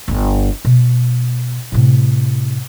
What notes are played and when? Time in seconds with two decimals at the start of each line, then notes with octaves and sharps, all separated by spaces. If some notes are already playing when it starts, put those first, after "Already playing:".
0.08 G1 B3
0.65 B2
1.72 A2 C3